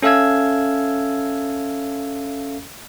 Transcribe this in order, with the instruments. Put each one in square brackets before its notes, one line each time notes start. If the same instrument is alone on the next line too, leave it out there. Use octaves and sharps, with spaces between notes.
[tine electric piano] C#4 A4 E5 F5 E6 G#6